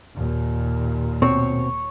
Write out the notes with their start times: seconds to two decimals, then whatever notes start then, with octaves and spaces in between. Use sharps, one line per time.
0.15 D#2 A#2
1.22 B2 C4 C#5